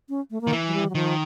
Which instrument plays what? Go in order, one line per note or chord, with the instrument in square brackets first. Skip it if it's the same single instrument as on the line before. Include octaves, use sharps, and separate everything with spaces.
[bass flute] C#4
A3
A#3
[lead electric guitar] D#3
E3
[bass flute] F#3
G3
F#3
[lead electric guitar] D#3 [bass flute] F3